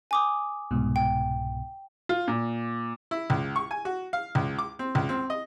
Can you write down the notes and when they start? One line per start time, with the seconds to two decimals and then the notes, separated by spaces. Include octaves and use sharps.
0.11 G#5 D6 D#6
0.71 C2 G#2 B2
0.96 G5
2.09 F4
2.28 A#2
3.11 E4
3.30 C#2
3.56 C#6
3.71 G#5
3.85 F#4
4.13 F5
4.35 C#2
4.59 D6
4.79 C4
4.95 C#2
5.09 C4
5.30 D#5